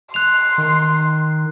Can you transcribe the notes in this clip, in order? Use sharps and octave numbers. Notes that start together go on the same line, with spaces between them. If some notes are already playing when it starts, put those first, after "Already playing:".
C6 F#6 F7
D#3